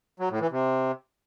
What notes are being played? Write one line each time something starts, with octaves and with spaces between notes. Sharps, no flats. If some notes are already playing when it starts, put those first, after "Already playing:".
F#3
A2
E3
C3